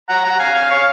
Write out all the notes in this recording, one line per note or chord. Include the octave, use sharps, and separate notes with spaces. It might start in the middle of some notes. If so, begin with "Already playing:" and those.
F#5 A#5
F#5 A#5
F5 G#5
F5 G#5
C#5 F5